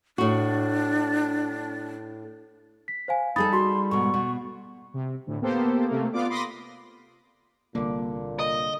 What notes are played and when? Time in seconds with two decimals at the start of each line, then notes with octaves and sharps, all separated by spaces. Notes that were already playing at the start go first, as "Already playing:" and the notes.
0.18 A2 D4 F#4
2.88 B6
3.08 C5 F5 G#5
3.36 G3 D#4 G#4 A4 B5 D#6 A6
3.53 F#4 C6
3.91 G#2 B2 C#6
4.14 B2
4.94 C3
5.26 D2 A2
5.41 A#3 B3 G4 A4 C5
5.87 C3 A3 A#3
6.13 B3 F4 D5 D6
6.29 B5 C6 D6 D#6 A#6
7.75 C2 A#2 D3 A#3
8.39 D#5